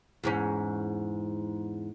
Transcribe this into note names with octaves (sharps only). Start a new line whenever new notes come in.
E2 G#2 C#4